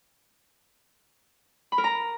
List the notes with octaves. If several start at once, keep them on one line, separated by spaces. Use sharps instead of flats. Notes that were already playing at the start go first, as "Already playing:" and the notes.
B5
A#4
A#5